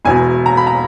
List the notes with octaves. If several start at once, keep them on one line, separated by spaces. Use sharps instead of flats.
E1 E2 B2 G#5
A#5
B5
A#5